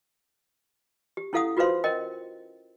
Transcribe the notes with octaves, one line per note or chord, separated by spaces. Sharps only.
G4
C#4 E4 A4 F5 F#5 D#6
F4 F#4 B4 C5 F5 C6
C#4 A#4 D#5 G5